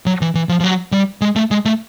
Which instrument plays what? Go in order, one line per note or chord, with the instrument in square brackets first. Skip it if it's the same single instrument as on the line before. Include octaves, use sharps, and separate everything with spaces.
[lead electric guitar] F#3
E3
E3
F3
F3
F#3
G3
G#3
A3
G#3
A3